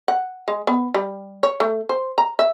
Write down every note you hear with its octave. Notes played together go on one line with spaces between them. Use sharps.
F#5
G#3
B3
G3
C#5
A3
C5
A#5
E5